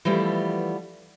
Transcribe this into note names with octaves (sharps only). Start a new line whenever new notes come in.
E3 F3 G3 A3 B3